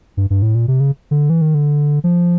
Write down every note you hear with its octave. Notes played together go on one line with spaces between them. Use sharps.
G2
G2
A2
A#2
C3
C#3
D3
E3
D#3
D3
F3